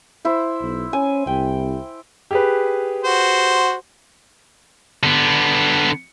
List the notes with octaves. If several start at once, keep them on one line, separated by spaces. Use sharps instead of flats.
E4 C5
B1
C#4 G#5
C2 G5
G4 G#4 B4
F#4 C5
D3 B3